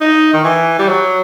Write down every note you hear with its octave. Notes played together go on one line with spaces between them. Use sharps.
D#4
D#3
E3
G3
F#3